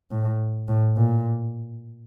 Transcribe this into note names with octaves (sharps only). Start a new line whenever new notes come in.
A2
A2
A#2